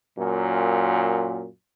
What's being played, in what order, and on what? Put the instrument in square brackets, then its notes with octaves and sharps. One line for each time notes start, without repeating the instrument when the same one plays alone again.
[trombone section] F#2 A#2